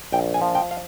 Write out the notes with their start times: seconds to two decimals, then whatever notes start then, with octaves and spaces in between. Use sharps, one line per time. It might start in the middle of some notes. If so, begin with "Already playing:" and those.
0.12 A#1 G5
0.34 G#5
0.41 F3
0.55 G5
0.71 F5